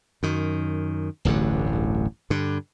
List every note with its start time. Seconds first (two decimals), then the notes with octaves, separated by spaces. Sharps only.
0.23 F#2 D#3
1.25 D1 A1 G2 D3
2.30 G2 D3